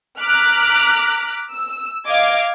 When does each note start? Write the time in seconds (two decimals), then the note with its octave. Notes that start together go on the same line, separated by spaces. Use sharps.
0.19 A#5 D6 F6 F#6 B6
1.52 E6
2.07 D#5 F5 D6 G#6